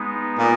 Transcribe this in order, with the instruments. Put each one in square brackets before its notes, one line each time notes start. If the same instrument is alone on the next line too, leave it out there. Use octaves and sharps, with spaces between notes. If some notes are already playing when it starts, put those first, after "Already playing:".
Already playing: [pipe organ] G#3 B3 D#4
[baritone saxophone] A#2